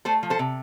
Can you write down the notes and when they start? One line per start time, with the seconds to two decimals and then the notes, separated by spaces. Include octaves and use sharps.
0.05 A3 A4 C5
0.23 F3
0.30 A4 C5
0.39 C3